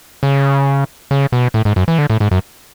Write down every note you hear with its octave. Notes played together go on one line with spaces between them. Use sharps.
C#3
C#3
B2
A2
G#2
F#2
E3
D3
A2
G#2
F#2